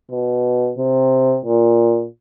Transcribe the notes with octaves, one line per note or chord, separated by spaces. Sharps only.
B2
C3
A#2